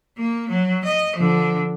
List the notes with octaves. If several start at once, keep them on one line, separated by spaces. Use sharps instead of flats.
A#3
F#3
D#5
D3 F3